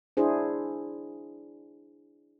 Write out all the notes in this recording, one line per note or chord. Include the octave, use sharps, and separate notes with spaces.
D4 E4 G#4 C5